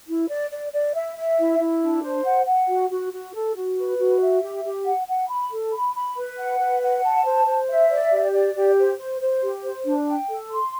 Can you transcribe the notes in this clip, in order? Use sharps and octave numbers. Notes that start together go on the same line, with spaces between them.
E4
D5
D5
D5
E5
E5
E4
E4
D4
C5
F#5
F#5
F#4
F#4
F#4
A4
F#4
B4
F#4
E5
G4
G4
F#5
F#5
B5
A4
B5
B5
B4
F#5
B4
F#5
A5
C5
C5
E5
D5
G4
D5
G4
C5
C5
C5
G4
C5
D4
G5
A4
C6